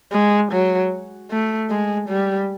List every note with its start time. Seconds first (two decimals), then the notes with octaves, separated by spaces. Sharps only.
0.12 G#3
0.52 F#3
1.30 A3
1.70 G#3
2.09 G3